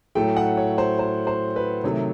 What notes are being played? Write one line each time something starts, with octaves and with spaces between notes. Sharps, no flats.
A2 F#3 A3 G5
F#5
C#5
C5
C5
C5
B4
C3 D#3 F#3 A3 C#5